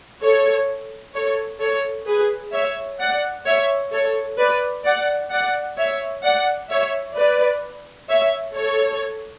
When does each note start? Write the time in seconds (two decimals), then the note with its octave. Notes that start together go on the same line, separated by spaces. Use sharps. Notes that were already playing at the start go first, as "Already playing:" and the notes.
0.21 A4 C#5
1.14 A4 C#5
1.60 A4 C#5
2.07 G#4 B4
2.53 C#5 E5
2.99 D5 F#5
3.46 C#5 E5
3.92 A4 C#5
4.38 B4 D5
4.85 D5 F#5
5.31 D5 F#5
5.77 C#5 E5
6.23 D5 F#5
6.70 C#5 E5
7.16 B4 D5
8.09 C#5 E5
8.55 A4 C#5